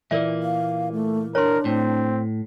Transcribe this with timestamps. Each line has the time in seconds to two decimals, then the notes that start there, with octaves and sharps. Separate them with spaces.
0.11 A#2 E3 A#3 A#4 D5 E5
0.43 F5
0.92 A3
1.35 D4 A#4 C#5 C6
1.65 A2 C4